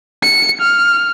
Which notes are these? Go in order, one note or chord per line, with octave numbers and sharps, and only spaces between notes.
C#7
F6